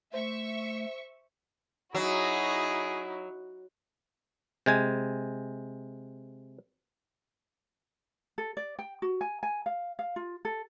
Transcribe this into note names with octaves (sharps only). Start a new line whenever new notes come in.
A3 C5 E5 C#6
F#3 D#4 E4 F#4 G#4
C3 G#3 G#5
A4
D5
G5
F#4
G#5
G#5
F5
F5
F4
A4